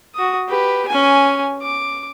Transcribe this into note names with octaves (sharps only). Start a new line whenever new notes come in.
F#4 D#6
G4 B4
C#4 G#5
D6